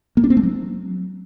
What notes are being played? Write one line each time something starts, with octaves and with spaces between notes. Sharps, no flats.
A#3
D4
C4
A3
F#3